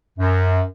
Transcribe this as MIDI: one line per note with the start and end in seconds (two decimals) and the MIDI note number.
0.19 0.62 42